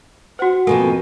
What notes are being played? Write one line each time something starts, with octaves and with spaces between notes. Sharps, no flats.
F#4 C5 F#5
F2 B2 A#3 A4 G#5